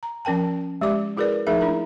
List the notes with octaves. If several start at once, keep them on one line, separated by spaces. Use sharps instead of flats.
A#5
F3 C#4 A#4 G5 A5
G#3 G4 D5 D6
E4 F#4 G#4 A#4 B4 D5
F3 A3 D#4 G#4 A#4 E5
D4 E4 A#4 A#5